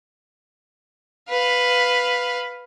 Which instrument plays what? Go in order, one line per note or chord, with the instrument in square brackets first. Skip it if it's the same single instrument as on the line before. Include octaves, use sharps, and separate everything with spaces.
[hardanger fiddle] B4 F5